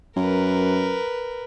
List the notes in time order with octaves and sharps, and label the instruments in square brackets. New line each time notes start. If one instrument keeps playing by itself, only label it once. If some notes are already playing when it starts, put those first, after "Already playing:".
[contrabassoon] F#2 [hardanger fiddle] A#4 B4